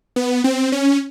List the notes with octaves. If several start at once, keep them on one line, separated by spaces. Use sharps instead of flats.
B3
C4
C#4